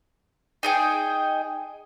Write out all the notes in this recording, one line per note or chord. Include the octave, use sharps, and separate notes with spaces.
D#4 G#4 G5